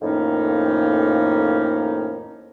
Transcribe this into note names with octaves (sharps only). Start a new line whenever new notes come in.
F2 A2 D#3 A#3 C#4 D#4